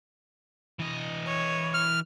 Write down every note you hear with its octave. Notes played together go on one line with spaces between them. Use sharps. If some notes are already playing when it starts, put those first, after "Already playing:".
E3 D#5
C#5
F6